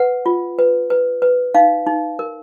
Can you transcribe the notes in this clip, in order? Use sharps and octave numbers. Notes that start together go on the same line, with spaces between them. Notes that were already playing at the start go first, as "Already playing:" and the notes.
Already playing: B4 F#5
F4
B4
B4
B4
D#4 F5
D#4
A#4